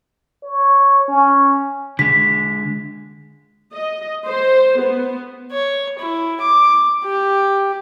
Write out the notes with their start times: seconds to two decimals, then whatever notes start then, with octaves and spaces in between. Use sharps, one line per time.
0.44 C#5
1.08 C#4
1.99 D3 G#3 B6
3.73 D#5
4.26 C5
4.79 B3
5.51 C#5
5.99 E4
6.41 D6
7.04 G4